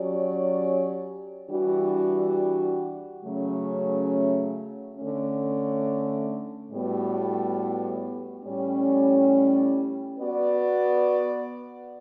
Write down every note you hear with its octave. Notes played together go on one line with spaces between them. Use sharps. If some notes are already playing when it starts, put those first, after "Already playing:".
Already playing: F#3 C#4 G4 D5
E3 G3 D4 F#4
C#3 F#3 A3 C#4
D3 A3 C#4
A2 G3 B3 F#4
A2 G3 C#4
B3 F#4 B4 D5